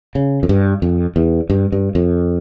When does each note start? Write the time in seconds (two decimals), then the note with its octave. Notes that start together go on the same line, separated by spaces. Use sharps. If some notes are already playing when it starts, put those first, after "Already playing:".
0.15 C#3
0.43 F2
0.49 G2
0.82 F2
1.16 E2
1.50 G2
1.72 G2
1.95 F2